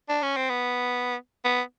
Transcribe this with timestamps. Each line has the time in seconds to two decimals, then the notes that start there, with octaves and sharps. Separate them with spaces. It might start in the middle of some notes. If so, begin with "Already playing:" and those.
0.09 D4
0.22 C#4
0.36 C4
0.49 B3
1.45 B3